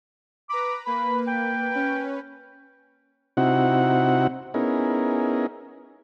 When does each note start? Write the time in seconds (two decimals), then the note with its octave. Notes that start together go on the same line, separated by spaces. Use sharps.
0.49 B4 A#5 B5 D6
0.86 A#3 B4 B5
1.27 G5
1.71 C#4 B4
3.37 C3 C4 D#4 E4 F#4 F#5
4.54 B3 C#4 D#4 E4 G#4 A#4